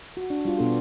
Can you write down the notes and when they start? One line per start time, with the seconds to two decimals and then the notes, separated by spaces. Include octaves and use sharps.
0.17 F#4
0.30 D4
0.45 G3 F4
0.58 B2 B3 D4 G4 A4